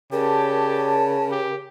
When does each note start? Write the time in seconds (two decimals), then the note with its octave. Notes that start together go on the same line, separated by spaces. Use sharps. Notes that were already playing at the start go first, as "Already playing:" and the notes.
0.12 C#3 G4 A#4 C#5 D5 A5
1.31 G4